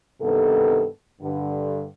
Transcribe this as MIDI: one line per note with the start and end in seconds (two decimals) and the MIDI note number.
0.21 0.85 43
0.21 0.85 48
0.21 0.85 51
0.21 0.85 59
0.21 0.85 69
1.22 1.84 43
1.22 1.84 50